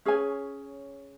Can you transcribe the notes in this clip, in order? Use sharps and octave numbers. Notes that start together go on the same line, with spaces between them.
C#4 G#4 C#5 G#5